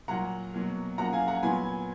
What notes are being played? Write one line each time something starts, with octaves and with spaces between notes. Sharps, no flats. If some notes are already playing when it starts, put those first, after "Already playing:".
A#2 F#3 A#3 F#5 A#5
B2 F#3 A#3
F#2 F3 A#3 F#5 A#5
F5 G#5
F#5 A#5
A#2 F#3 B3 G#5 B5